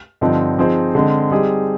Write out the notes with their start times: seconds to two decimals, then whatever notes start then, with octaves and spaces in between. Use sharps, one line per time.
0.21 G2 D3 F3 C4 D#4
0.58 F3 C4 D#4 G#4 C5
0.95 D3 G#3 C4
1.31 G3 C4 D#4 G#4